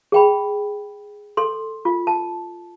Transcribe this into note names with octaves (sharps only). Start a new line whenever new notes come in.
G#4 G5 B5
A4 C6
F4
A5